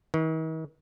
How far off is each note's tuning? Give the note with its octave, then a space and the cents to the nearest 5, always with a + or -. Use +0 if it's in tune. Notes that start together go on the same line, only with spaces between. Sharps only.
D#3 +45